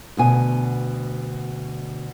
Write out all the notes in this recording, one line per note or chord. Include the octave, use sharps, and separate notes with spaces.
D2 B2 G#5